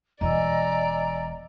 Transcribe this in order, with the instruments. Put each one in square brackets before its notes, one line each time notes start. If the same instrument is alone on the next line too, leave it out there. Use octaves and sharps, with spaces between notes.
[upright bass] E1 E3 [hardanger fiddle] D5 [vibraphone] D#5 G#5 E6 [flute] A#5